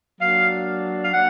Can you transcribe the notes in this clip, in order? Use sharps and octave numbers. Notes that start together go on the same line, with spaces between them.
F#3 A#3 D4 F5
F5
F#3 A#3 D4 F#5